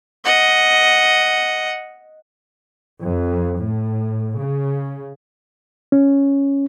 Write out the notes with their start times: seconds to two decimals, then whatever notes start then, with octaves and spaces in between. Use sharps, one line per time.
0.25 D#5 F#5
3.04 F2
3.60 A2
4.38 C#3
5.92 C#4